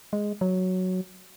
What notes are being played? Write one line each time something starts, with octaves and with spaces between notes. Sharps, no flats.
G#3
F#3